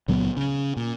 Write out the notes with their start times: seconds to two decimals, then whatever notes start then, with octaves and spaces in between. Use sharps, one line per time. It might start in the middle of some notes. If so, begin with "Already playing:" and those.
0.08 C#2 A#2 F#3 B3
0.37 C#3
0.77 A#2